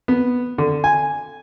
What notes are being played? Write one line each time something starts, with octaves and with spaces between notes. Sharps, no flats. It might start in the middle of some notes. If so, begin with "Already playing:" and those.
B3
D3
G#5